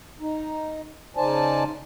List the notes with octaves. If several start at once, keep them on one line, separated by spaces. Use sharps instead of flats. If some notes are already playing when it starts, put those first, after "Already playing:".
D#4
C#3 D#4 C5 D5 G#5 A5